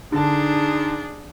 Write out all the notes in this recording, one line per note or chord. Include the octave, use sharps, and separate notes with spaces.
D3 D4 D#4 G#4 A5